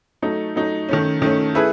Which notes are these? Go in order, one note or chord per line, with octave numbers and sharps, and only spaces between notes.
F#3 A3 D#4
F#3 A3 D#4
D#3 A3 C#4
D#3 A3 C#4
A3 E4 G#4 B4